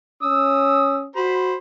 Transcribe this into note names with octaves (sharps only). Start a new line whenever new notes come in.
C#4 D#6 E6
F#4 C5 B5